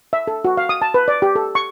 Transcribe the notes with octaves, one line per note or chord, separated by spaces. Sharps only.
E5
A4
F#4
F5
D#6
A5
B4
D5
G4
A4
C#6